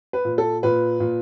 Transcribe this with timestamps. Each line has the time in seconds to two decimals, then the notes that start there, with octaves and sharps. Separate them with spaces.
0.13 B4
0.25 A#2
0.38 A4
0.63 A#2 B4
1.00 A#2